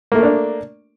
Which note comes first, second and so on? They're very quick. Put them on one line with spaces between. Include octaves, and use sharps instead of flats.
A#3 A3 A#4 D4